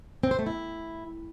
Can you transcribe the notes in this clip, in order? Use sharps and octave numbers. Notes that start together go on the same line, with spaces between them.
C4
C5
A3
E4